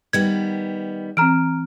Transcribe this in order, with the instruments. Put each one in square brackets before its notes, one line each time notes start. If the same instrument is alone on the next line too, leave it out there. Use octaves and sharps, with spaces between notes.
[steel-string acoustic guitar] D#3 G3 B3 [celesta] G#6
[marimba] E3 C4 [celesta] A#5 F6 D7